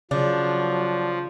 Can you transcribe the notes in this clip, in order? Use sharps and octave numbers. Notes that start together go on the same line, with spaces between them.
C#3 F3 F#3 D4